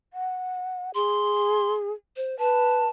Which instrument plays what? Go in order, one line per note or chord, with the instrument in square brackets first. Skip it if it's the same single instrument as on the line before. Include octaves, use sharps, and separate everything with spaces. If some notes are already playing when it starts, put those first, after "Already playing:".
[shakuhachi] F#5
[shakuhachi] G#4 [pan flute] C6
[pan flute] C5
[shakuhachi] B4 [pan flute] A5